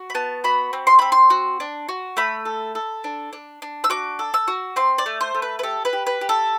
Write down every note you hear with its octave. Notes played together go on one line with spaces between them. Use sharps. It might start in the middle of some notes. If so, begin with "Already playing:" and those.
Already playing: F#4
B5
B3 A5
F#4 B5
C4
C6
C4 B5
C6
F#4
D4
F#4
A3 B5
A4
A4
D4
D4
D4
E6
F#4 D6
A4
E6
F#4
C4 C6
D5
A3
C5
A3
B4
B4
G4 A4
B4
G4
B4
G4
A4